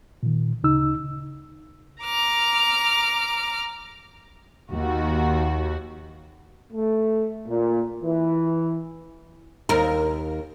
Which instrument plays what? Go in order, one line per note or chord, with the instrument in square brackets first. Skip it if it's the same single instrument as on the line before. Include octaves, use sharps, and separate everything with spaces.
[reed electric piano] A#2 D#3
D2 C#3 D#4 E6
[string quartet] A#5 D6 F6
[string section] D#2 F#4
[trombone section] A3
A#2
E3
[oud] D#2 A#4